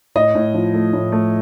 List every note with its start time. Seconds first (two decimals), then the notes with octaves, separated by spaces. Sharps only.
0.15 A2 D#5
0.35 A2
0.54 F3
0.74 A3
0.93 A2
1.12 A3